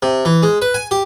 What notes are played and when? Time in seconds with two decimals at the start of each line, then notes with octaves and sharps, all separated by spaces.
0.02 C3
0.25 E3
0.43 G#3
0.62 B4
0.74 G#5
0.91 G4